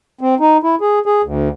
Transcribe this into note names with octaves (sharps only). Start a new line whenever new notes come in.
C4
D#4
E4
G#4
G#4
D2